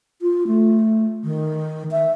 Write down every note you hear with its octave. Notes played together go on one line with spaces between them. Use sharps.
F4
A3
D#3
E5